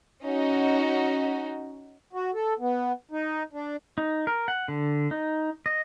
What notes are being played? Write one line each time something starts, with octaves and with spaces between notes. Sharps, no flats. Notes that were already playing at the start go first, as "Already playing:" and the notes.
C#4 D#4 F#4
F#4
A4
B3
D#4
D4
D#4
A#4
F#5
D3
D#4
D#5